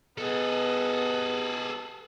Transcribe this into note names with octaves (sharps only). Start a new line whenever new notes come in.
B3 G#4 A4 D#5